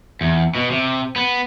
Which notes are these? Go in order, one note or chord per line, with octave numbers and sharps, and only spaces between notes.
E2
B2
C3
B3